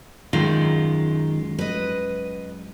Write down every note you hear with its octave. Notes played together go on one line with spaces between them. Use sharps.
F#2 D#3 G#3 F4
B4 D#5